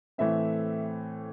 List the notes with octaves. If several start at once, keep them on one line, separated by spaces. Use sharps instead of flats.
A2 E3 A3 C4 E5